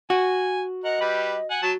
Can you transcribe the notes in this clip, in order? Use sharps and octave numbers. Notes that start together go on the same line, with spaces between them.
F#4 G#5
A#4 D#5 F#5
G3 G4 B4
F#5 G#5
F#3 F#4 A5